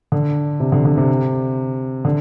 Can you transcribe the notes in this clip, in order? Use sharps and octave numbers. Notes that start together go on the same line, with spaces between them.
D3
C3
D3
D3
C3
D3